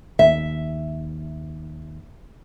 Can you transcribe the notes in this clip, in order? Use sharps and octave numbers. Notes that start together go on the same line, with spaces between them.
D#2 E5